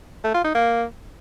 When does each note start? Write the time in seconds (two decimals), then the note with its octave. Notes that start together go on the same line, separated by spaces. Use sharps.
0.24 A3
0.34 F4
0.45 D#4
0.55 A#3